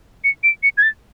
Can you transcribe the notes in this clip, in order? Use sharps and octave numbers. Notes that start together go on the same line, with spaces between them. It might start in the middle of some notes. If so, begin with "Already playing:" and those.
C#7
D7
C#7
G#6
A6